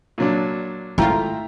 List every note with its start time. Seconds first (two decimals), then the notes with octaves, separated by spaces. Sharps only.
0.18 A#2 F#3 D4
0.98 G#1 A3 E4 F4 E5 G5 A#5